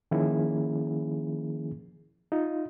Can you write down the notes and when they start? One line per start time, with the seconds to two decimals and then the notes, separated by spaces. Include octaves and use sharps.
0.11 D#3 F3 A#3 C#4 E4 G#4
2.32 D#4 F4